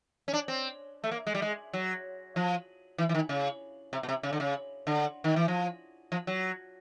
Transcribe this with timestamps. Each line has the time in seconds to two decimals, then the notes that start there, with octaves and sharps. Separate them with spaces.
0.28 C#4
0.33 D4
0.48 C4
1.04 A3
1.11 A#3
1.27 G#3
1.35 G3
1.42 G#3
1.73 F#3
2.36 F3
2.98 E3
3.09 E3
3.14 D#3
3.29 C#3
3.93 C3
4.03 B2
4.09 C3
4.23 C#3
4.32 D3
4.40 C#3
4.87 D3
5.24 D#3
5.36 E3
5.48 F3
6.12 F3
6.27 F#3